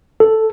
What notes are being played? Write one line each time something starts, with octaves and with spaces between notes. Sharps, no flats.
A4